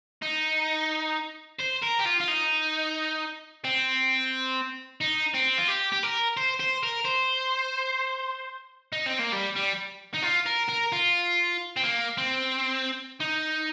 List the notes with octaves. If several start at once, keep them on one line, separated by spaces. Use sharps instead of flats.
D#4
C5
A#4
G4
F4
F4
D#4
C4
D#4
C4
F4
G4
G4
A#4
C5
C5
A#4
C5
D#4
C4
A#3
G3
G3
D#4
F4
A#4
A#4
F4
C4
A#3
C4
D#4